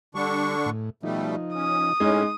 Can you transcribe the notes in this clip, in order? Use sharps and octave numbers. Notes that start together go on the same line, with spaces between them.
D3 G3 D4 C#6
A2
B2 F3 G3 A3 D#4
C#4 D#6
A2 G#3 C#4 D#4